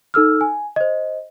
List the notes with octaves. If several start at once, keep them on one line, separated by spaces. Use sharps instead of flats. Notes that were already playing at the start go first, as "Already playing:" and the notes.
D#4 A4 E6 F6
G#5
C5 D#5